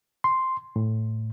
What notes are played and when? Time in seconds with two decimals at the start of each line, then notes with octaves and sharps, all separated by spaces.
0.24 C6
0.76 A2